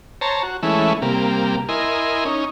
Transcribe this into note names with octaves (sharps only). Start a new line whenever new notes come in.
C5 C#5 A5 A#5
F#4
E3 G#3 A3 C#4 E4
C3 G3 A#3
E4 A#4 D#5 G#5 C6
C#4 D#4